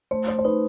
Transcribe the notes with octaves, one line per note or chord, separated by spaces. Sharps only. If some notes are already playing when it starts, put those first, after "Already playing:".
A3 C5
C5
C5
D#4 B4